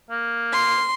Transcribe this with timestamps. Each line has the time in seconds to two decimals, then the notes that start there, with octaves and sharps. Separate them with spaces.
0.10 A#3
0.53 C6